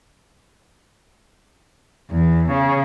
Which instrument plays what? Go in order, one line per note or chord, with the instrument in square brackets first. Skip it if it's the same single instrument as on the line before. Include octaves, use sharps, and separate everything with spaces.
[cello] E2
C#3